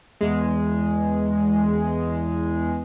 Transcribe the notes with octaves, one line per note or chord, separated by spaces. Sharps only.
E2 G#3